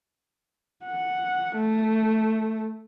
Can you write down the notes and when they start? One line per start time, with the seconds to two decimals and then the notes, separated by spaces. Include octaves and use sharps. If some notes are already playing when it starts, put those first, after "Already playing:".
0.85 F#5
1.55 A3